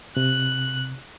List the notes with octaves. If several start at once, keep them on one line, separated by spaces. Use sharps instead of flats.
C3 F#6